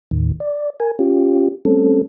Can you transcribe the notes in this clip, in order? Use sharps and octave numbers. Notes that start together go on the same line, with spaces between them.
D#2 A2 D#3
D5
A#4 G#5
C#4 F4 G4
G3 A3 C4 C#4 A4